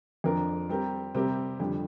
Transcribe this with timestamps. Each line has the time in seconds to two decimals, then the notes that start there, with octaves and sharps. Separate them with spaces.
0.24 F2 F3 D4 A#4
0.69 G3 C4 G4 A#4
1.15 C3 G3 C4 G4 A#4
1.60 F2 D3 G3